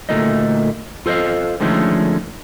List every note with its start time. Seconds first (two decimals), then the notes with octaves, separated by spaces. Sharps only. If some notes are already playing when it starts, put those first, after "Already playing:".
0.09 D2 A#2 A3 D#4 D#5
1.06 F4 A4 C5 C#5 D#5 F5
1.60 D3 D#3 F3 G#3 A3 C#4